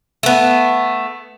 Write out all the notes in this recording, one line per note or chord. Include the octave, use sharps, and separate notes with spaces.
A3 B3